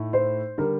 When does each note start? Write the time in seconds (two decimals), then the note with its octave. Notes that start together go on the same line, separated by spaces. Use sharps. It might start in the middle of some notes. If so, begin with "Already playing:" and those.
Already playing: A2 A3 D#4
0.13 C5
0.58 D3 G3 A#4